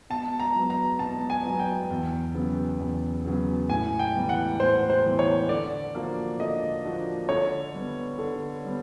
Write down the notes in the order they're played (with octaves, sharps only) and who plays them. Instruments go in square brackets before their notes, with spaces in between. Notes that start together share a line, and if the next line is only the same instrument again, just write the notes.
[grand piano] B2 [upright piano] A5
[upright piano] A#5
[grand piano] F#3 B3
[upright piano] A#5
[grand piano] B2 [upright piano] A5
[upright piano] G#5
[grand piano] F#3 B3
[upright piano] G5
[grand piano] E2
C#3 F#3 B3
E2
C#3 F#3 B3
[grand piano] A2 [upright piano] G#5
[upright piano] G5
[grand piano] E3 G3 B3
[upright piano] F#5
[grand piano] A2 [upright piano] C5
[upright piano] C5
[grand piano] E3 G3 B3
[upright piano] C#5
[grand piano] D3 [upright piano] D5
[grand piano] F3 A#3 D4 F#4
[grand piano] D3 [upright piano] D#5
[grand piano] F3 A#3 D4 F#4
[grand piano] D3 [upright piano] C#5
[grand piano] G3 B3
D3
G3 B3